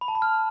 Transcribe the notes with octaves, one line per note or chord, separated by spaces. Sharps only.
B5
A5
B5
F6